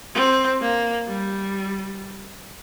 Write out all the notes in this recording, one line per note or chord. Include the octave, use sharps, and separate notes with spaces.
C4
A#3
G3